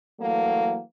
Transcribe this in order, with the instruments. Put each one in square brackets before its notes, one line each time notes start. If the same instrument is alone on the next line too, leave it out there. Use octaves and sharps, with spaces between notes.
[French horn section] E3 F#3 A3 A#3